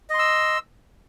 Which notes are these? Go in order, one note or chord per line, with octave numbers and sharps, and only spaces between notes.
D#5 C6 E6